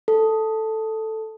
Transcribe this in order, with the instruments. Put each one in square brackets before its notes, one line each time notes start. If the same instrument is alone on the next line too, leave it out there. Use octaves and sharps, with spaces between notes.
[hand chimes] A4